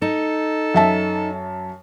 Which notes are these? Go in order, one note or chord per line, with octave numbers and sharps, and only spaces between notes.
D#4 A4
F#2 E5 A5